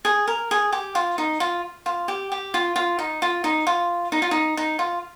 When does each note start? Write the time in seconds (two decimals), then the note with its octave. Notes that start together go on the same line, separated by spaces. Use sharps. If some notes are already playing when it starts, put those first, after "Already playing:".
0.05 G#4
0.27 A#4
0.51 G#4
0.72 G4
0.95 F4
1.18 D#4
1.40 F4
1.86 F4
2.08 G4
2.32 G4
2.54 F4
2.76 F4
2.99 D#4
3.22 F4
3.44 D#4
3.67 F4
4.12 D#4
4.22 F4
4.31 D#4
4.57 D#4
4.79 F4